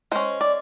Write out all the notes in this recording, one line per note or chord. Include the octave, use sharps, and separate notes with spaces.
G#3 C#4 C5
D5